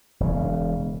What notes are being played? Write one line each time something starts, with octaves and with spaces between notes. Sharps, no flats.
E1 C#3